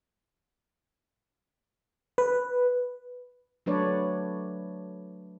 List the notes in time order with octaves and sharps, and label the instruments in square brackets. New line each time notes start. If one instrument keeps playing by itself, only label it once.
[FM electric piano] B4
[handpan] F#3 A3 D4 B4 C#5 D5